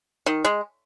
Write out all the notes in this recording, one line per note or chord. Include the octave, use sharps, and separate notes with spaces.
D#3
G#3